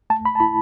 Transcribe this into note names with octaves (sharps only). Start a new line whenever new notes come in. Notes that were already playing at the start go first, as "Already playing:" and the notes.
A3 A5
B5
A5
E4 B5